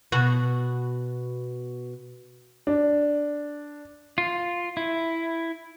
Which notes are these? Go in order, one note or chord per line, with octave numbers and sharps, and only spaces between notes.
B2 F#4
D4
F4
E4